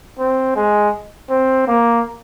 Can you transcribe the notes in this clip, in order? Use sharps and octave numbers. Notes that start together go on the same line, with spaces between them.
C4
G#3
C4
A#3